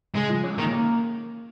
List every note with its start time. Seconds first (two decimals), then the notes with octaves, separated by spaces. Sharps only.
0.15 C#3 G#3
0.29 F3
0.44 C#4
0.58 D#3 A#3
0.73 A#3